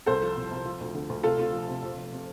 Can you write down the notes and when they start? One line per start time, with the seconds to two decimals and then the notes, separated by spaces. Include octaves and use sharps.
0.06 C2 A4 C5
0.22 F3
0.37 C2
0.51 C2
0.65 F3
0.80 D2
0.94 D3
1.09 D2
1.23 C3 F4 A4
1.38 C3 F4
1.53 F3
1.68 C3
1.83 F2
1.96 F1
2.12 C3